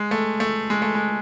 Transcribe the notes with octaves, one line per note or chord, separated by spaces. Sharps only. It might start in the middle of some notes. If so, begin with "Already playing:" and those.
Already playing: G#3
A3
A3
G#3
A3
G#3